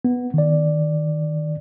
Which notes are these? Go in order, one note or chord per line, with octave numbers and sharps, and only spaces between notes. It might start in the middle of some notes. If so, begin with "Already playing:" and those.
B3
D#3 D5